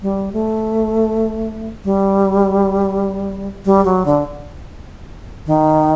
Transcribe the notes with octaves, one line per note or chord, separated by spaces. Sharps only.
G3
A3
G3
G3
F#3
D3
D#3